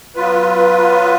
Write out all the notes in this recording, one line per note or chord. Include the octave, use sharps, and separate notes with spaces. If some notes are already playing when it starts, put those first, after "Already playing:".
F#3 B3 F4 B4